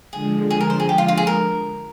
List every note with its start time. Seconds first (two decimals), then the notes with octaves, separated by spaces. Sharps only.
0.13 D3 F3 G#3 G#4
0.50 G#4
0.61 A#4
0.70 C5
0.80 G#4
0.89 G4
0.98 F4
1.08 F4
1.17 G#4
1.27 A#4